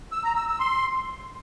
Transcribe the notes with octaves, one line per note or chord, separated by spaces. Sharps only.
E6
A#5
E6
E6
C6